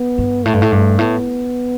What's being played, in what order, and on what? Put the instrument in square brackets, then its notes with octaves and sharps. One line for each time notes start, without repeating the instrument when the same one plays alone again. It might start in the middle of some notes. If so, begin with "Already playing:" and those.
Already playing: [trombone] B3
[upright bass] G2
[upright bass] A2 [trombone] A3
[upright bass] G2
A2
G2
[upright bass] A2 [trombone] B3